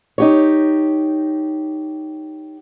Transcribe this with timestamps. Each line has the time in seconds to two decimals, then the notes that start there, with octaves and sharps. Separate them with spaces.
0.18 D#4 G4 C#5